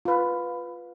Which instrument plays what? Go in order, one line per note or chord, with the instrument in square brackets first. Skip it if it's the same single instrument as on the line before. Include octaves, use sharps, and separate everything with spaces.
[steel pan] F4 B4